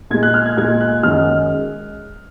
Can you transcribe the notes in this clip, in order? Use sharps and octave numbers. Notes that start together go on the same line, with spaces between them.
A#2 G#3 G#6
F#6
F6
G#6
A#2 G#3 G#6
F#6
F#2 D#3 G#3 F6